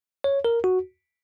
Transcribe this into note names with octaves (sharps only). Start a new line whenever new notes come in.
C#5
A#4
F#4